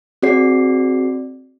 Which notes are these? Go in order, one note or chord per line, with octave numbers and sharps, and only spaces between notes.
C4 F#4 G#4 D5 C7